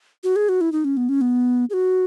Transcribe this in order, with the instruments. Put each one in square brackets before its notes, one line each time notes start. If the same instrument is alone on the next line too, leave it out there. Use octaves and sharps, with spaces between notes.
[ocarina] F#4
G#4
F#4
E4
D#4
C#4
B3
C#4
B3
G#4
F#4